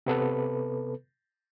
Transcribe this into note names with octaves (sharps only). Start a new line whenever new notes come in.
C3 B3 A4 B4